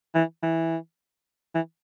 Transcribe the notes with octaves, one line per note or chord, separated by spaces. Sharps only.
E3
E3
E3